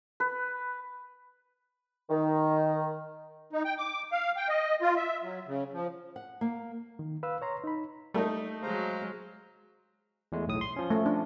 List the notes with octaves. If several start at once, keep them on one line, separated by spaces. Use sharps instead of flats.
B4
D#3
D#4
G5
D6
F5
G5
D#5
F4
E5
F#3
C#3
F3
F#5
A#3
D#3
B4 F5 E6
C#5 A#5 C6
D#4 B5
G3 A3 A#3 D#4
F#3 G#3 C5 F5 A#5
E2 G#3 A3
B1 A2 D#6
C6
F3 C#4
A3
D4